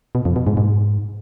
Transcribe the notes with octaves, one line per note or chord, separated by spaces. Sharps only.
B2
F2
B2
G#2
G#2